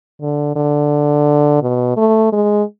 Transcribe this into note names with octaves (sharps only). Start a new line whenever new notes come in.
D3
D3
B2
A3
G#3